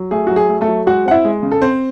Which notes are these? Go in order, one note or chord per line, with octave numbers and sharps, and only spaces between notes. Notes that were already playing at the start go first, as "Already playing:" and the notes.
Already playing: F#3
A3 G#4
F#3 F#4
G#4
A3
A3 A4
F#3
G#3 F#4 F#5
C4 F#5
E4 E5
G#3
C#3
A4
C4 C5